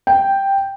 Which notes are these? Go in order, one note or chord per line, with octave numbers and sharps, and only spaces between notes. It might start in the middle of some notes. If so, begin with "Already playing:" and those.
G5